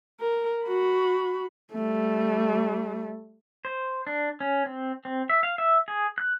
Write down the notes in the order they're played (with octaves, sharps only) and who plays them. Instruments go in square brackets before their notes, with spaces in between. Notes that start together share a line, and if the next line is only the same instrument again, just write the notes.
[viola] A#4
F#4 B5
[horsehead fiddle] G3 A3
[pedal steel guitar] C5
D4
C#4
C4
C4
E5
F5
E5
G#4
F#6